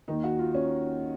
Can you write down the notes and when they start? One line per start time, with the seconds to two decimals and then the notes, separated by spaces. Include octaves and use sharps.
0.08 D#2 D#3 D#4
0.24 F#4
0.39 F4
0.55 C#4